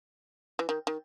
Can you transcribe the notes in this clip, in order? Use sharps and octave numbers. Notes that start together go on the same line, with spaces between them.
E3
D#3
D#3